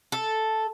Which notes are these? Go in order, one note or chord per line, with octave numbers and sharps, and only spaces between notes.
A4